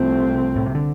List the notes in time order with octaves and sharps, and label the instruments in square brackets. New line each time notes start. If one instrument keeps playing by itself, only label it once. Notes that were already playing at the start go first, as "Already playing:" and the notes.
Already playing: [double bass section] C2 C3 A3 C4 [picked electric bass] F3
[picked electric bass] A2
C3
D3